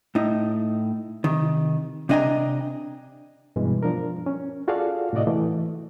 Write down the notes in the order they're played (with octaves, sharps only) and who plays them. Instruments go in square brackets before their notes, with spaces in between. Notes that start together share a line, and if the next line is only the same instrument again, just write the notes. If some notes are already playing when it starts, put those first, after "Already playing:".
[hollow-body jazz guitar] A2 D#4
C3 D#3
C3 D4 D#5 G5 G#5 A#5
[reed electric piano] G2 B2 E3 G3 G#3
F3 D4 A#4
C#4
F4 F#4 G#4 A4 D5 F5
A2 C3 F#4 D5 D#5
E3 A3